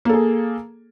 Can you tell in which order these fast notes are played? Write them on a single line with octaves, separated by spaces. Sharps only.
A#3 A4 G#4